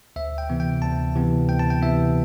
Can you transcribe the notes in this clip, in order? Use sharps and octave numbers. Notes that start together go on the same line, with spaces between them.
D2 E5
G5
C3 E3 B3
G5
D2 A5
C3 E3 B3
D2 G5
A5
G5
C3 E3 B3 E5